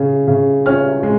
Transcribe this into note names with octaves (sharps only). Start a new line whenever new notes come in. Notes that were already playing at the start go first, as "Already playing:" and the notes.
Already playing: C#3
C#3
C#4 F6
G#3